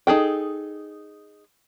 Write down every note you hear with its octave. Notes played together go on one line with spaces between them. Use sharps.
D#4 G#4 A4 G5